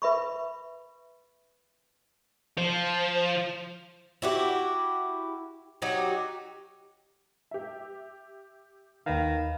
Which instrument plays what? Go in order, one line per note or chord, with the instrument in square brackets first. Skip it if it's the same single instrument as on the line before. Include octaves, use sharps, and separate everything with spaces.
[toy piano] B4 E5 B5 C#6
[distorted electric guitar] F3 [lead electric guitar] C5
[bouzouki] E4 F#4 G4
F#3 D#4 F#4 G4
[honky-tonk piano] G4 E5
[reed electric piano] D#2 F5 [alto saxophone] D#3 [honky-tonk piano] B4